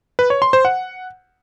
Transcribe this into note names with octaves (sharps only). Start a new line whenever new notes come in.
B4
C#5
C6
C5
F#5